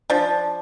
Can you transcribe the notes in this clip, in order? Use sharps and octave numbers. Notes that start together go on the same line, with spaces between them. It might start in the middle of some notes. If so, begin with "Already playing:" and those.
F3 D4